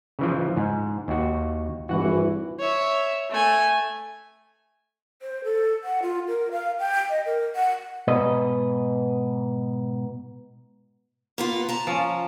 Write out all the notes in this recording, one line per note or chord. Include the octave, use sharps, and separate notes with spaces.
C#3 E3 F3
G#2
D#2 F#4
G#1 G2 E3 F#4 F#5
C#5 E5
A3 G#5
C5
A4
F#5
F4
A#4
F5
G5
D#5
A#4
F#5
G#2 B2 B4 D#5
A#3 B3 F4
A5 A#5
F3 C#4